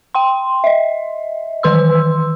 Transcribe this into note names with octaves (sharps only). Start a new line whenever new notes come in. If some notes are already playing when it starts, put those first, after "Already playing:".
G5 C6
D#5 E5
D#3 E3 B4 C6 E6